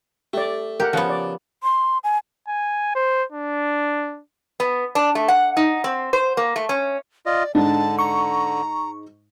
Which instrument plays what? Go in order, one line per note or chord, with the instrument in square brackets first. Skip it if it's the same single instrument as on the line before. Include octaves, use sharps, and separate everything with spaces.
[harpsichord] A3 [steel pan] G4 D5
[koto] G4 [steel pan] A#4 F#5
[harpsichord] C#3 [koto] F3 B3 [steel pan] F#5
[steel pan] D5
[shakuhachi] C6
G#5
[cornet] G#5
C5
D4
[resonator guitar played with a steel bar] B3
D4
A3
F#5
D#4
C4
C5
A#3
A3
C#4
[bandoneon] F4 D#5 [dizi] D5
[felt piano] G#2 D#4 [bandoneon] D3 [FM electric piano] D4 [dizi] A5
[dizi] A#5 [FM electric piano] C#6